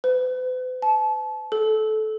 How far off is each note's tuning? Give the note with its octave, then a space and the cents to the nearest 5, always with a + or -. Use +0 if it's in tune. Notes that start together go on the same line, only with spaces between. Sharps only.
B4 +45
A5 -30
A4 -20